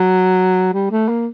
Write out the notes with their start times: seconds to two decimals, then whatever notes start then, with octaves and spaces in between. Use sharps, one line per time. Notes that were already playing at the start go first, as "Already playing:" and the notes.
Already playing: F#3
0.74 G3
0.91 A3
1.08 A#3